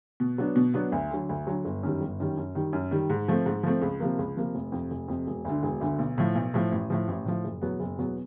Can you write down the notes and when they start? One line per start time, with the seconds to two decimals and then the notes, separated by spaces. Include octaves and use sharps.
0.20 B2
0.38 F#3 B3 D4
0.56 B2
0.74 F#3 B3 D4
0.92 D2
1.11 D3 F#3
1.29 D2
1.47 D3 F#3
1.65 G1
1.83 F#2 D#3 G3
2.01 G1
2.20 F#2 D#3 G3
2.37 F#2
2.55 D#3 G3
2.73 F#2
2.91 D#3 G3
3.10 G#2
3.28 F3 A3 C4
3.46 G#2
3.63 F3 A3 C4
3.82 C#2
4.00 C3 F3 A#3
4.19 C#2
4.36 C3 F3 A#3
4.55 F1
4.72 F2 C3
4.91 F1
5.08 F2 C3
5.27 E1
5.45 D2 D3
5.63 E1
5.81 D2 D3
5.99 B1
6.18 A2 F3
6.35 B1
6.54 A2 F3
6.72 A1
6.90 A2 F3
7.08 A1
7.25 A2 F3
7.44 F#1
7.62 E2 B2 F#3 B3
7.80 F#1
7.98 E2 B2 F#3 B3